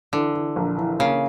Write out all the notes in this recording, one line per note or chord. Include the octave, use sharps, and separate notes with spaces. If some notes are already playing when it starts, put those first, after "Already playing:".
D3 E3
E3
A#1
E3
C#3 A#3